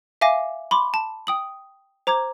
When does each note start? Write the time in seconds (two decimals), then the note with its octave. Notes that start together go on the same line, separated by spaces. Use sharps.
0.21 E5 F5 G#5 D6 A#6
0.71 B5 C6 D6
0.94 A5
1.27 G5 D#6 F#7
2.07 C5 A#5 D6 G#6